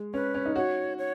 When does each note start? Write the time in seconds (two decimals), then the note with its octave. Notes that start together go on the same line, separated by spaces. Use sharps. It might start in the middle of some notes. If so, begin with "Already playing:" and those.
Already playing: G#3
0.14 C#4 B4
0.35 C#4
0.46 D#4
0.56 F#4 C#5
0.98 C#5